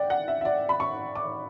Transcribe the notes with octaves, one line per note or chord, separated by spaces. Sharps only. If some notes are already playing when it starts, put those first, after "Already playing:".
Already playing: D5 F#5 G5
F#5
E5
E5
D5
B5
C#6
D6